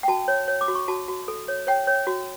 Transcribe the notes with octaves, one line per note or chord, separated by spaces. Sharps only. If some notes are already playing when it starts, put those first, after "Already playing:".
G5
F#4 A5
C#5
C#5
D6
F#4
C#6
F#4 A5
F#4
A4
C#5
C#5 G5
C#5
F#4